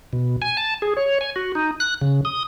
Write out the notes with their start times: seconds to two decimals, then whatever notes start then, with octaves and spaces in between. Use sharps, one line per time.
0.13 B2
0.42 G#5
0.57 A5
0.82 G#4
0.97 C#5
1.21 G#5
1.36 F#4
1.55 D#4
1.80 F#6
2.01 C#3
2.25 D#6